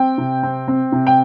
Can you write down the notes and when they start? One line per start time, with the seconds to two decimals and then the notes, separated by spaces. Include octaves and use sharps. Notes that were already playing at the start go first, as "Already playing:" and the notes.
Already playing: C4 G5
0.18 C3
0.43 C4
0.68 C4
0.92 C3
1.07 G5